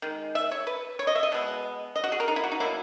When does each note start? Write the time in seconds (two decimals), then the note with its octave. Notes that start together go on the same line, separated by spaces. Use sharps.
0.02 D#3 G#3
0.35 E5
0.51 C#5
0.67 B4
0.99 C#5
1.07 D#5
1.15 E5
1.23 D#5
1.32 B2 G#3 B3
1.96 D#5
2.04 F#4
2.12 G#4
2.20 A#4
2.28 D#4
2.36 E4
2.44 F#4
2.52 D#4
2.60 B2 F#3 A#3 E4